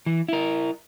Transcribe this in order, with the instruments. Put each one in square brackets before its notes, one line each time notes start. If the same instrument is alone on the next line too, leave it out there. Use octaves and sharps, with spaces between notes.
[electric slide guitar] E3
E4 A#4